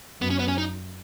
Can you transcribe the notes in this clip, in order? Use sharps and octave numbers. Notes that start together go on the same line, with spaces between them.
F#2 B3
C#4
B3
C#4
D#4